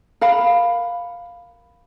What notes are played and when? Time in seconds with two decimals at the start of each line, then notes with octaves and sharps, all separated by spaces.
0.21 A#4 F5 F#5 B5